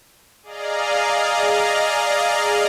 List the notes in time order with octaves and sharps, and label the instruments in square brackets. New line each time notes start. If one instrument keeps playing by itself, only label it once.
[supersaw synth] G#4 D5 D#5 F5 A#5